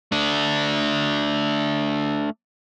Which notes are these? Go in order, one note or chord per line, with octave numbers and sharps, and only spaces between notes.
A3 D4